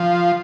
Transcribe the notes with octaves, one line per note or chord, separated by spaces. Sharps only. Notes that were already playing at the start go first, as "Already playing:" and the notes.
Already playing: F3